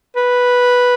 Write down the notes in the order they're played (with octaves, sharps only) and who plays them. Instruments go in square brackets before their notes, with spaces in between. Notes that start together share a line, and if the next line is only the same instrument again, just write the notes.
[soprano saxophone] B4